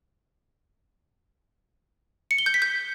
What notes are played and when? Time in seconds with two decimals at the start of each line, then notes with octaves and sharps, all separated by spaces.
2.31 C#7
2.38 G7
2.46 G6
2.54 B6
2.62 G6